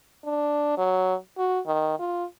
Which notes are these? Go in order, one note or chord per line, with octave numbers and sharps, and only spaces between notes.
D4
F#3
F#4
D#3
F4